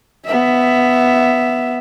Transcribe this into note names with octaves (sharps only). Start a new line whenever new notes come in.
B3 E5